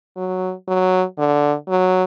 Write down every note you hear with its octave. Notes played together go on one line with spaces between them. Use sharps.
F#3
F#3
D3
F#3